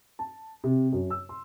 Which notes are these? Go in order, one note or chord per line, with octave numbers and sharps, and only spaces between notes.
A5
C3
F#2
E6
C6